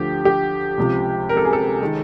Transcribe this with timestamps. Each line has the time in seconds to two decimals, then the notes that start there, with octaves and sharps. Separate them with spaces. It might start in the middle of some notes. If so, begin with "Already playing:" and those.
Already playing: D2 D3 F3 G4
0.25 G4
0.78 C#2 C3 F3
1.29 A#4
1.37 A4
1.45 G#4
1.53 A4
1.81 D#3 G#3